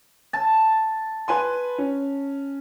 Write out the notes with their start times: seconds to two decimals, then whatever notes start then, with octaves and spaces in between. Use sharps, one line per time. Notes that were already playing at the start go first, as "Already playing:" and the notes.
0.33 A5
1.28 B4 G#5 C6
1.78 C#4